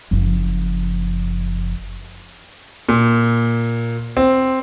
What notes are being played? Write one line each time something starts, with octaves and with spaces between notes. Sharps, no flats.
F#1 F3
A#2
C4